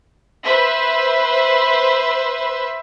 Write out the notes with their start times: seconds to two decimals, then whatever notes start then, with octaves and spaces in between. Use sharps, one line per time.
0.43 B4 C5 E5